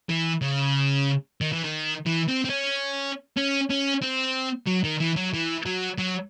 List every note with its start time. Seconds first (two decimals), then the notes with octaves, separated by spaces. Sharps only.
0.10 E3
0.42 C#3
1.41 D#3
1.52 E3
1.64 D#3
2.06 E3
2.28 C4
2.44 C4
2.49 C#4
3.37 C#4
3.70 C#4
4.02 C4
4.67 F#3
4.84 D#3
5.00 E3
5.16 F#3
5.33 E3
5.66 F#3
5.98 F#3